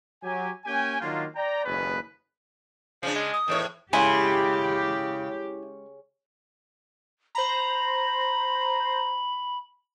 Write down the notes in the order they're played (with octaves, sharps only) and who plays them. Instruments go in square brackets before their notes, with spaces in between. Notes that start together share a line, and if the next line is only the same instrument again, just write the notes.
[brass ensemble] F#3 G4 G#5
A#3 C#4 G4 G5 G#5
D#3 F#3 A#3 D4 F4
D5 G5 A#5
F#1 D#2 G#3 B3 C#4 B4
[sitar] C#3 D4 [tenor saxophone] F3
[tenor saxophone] G#3
[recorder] D#6
[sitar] E2 A2 C#5 [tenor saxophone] D#3
[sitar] C#3 [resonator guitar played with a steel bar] G#3 G#5 [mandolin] E4 [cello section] G4
[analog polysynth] C5 A#5 [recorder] B5